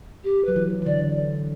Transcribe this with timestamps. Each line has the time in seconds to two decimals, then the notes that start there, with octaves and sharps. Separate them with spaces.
0.24 G4
0.45 F#3 B4
0.56 E3
0.82 E3
0.86 D3 D5